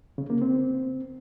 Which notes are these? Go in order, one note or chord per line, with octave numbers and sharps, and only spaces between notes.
C#3
A#3
C4